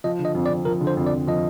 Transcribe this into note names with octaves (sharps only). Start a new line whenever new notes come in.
F3 D#5
D3
D#5
F2
D5
F2
F3 A#4
D3
C5
F2
D5
F2
F3 D#5